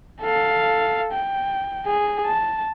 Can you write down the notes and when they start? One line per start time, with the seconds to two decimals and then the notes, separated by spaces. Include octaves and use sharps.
0.21 A4 F5
1.12 G5
1.86 G#4
2.25 A5